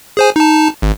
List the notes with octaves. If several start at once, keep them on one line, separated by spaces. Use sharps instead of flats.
G#4 C5 G#5
D#4 A5
G#1